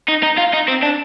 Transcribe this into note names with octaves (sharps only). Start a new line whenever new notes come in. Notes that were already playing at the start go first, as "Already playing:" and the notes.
D#4
D#4
F4
D#4
C4
D4